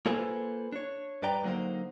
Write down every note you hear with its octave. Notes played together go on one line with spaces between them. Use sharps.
A#3 F4 A4 B4 C5 G#5
D4 C#5
G2 B4 D5 G5 A#5
D3 F#3 A#3 D#4 C5